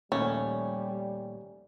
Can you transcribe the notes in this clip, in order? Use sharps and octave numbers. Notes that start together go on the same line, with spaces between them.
A#1 D#2 G3 A3 C#4